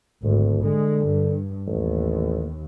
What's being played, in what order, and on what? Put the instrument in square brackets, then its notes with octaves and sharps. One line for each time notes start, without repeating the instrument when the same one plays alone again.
[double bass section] G#1 [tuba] D2
[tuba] D3 [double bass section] G#3
[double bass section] G2
[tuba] A1 [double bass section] D#2